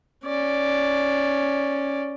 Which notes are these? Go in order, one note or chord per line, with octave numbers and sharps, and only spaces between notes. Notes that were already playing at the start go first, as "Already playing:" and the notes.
C#4 D5